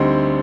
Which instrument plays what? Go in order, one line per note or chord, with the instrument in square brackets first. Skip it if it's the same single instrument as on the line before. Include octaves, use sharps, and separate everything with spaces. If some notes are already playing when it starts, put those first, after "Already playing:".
Already playing: [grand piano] D2 D3 G3 C4 D#4